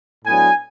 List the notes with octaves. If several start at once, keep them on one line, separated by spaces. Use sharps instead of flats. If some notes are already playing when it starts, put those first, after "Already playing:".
A2 F#3 B3 D4 G#5